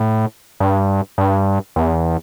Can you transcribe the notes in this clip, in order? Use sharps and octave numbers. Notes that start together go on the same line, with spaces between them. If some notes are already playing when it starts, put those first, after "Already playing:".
Already playing: A2
G2
G2
E2